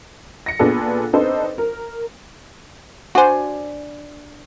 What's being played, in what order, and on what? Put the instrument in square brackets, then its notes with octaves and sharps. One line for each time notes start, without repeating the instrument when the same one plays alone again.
[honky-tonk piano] A#6 C#7
A#2 B3 D4 F4 G#4 A4
C4 D4 D#4 A4 B4 C5
A#4
[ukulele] D4 D5 G#5 [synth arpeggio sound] F#4 C5